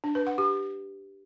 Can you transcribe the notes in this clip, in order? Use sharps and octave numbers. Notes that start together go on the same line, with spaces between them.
D4
B4
F#5
G4